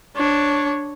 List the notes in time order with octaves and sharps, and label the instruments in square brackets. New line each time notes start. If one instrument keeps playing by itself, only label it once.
[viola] D4 C#5